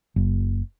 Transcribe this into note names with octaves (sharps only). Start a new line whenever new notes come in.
F#1